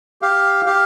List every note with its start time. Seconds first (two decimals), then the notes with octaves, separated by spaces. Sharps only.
0.22 G4 F5
0.66 G4 F5